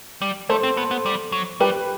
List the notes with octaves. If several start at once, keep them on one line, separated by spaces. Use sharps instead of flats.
G3
A3 A4 C5
C4
B3
B3
G3
F#3
G3 G4 B4